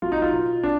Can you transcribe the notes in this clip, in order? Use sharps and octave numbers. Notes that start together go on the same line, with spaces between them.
F#3 F4
D#4
F4
B2
D4